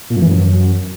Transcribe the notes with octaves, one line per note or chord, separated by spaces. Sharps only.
A#2
F#2
E3
F#2